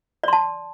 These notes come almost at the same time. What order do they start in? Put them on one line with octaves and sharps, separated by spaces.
D5 C6 A5